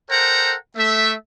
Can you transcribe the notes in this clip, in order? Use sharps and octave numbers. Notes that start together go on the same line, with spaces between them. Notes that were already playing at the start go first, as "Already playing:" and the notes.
A4 A#4 C5 F#5 G5 A#5
A3 E5